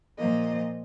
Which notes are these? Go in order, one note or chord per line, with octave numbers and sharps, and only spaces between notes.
A#2 F3 A#3 D#5